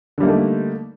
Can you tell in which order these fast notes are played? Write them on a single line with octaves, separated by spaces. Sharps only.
D3 G3 A#3 D#4 A3